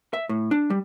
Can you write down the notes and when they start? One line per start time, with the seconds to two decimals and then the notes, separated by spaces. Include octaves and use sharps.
0.13 E5
0.29 A2
0.51 D4
0.70 G3